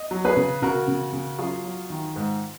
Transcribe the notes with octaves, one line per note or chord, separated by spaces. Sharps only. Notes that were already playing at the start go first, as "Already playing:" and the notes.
Already playing: D#5
F#3
G#4 B4
C#3
C#3 F#4 A#4
C#3
C#3
F#3 F4 G#4
F#3
D#3
G#2